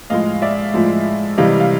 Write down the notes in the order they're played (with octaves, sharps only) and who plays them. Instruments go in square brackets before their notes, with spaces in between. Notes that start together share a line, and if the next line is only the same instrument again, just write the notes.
[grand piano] A2 F3 G#3 D#5 F5
D5 E5
A2 F3 G#3
C3 E3 G3 D#5 F5
F5